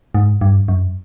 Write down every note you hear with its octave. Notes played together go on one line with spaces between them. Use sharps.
G#2
G2
F#2